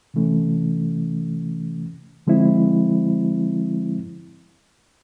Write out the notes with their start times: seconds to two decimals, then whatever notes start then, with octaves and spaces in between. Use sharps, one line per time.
0.14 C3 E3 A3 C#4
2.27 D3 F3 G#3 C4 E4